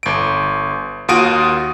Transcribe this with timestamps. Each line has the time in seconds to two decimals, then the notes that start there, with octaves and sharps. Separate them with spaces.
0.03 G1 D7
1.08 D#2 F4 F#4 D#6 D7 D#7